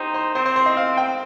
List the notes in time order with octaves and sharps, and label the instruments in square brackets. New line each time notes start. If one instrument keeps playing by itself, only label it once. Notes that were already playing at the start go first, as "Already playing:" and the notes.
Already playing: [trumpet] D#4 [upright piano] G4 C5
[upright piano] C5
[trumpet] C4 [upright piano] C5
[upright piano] C5
C5
D#5
F5
G5